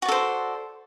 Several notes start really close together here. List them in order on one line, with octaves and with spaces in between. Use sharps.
F#4 D5 A4 C5